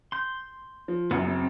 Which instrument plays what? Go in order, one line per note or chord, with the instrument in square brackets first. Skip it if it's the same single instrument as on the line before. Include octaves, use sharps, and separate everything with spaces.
[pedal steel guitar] C6 G6
[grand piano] F3
[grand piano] F#1 F#2 [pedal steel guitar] B3
[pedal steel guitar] C4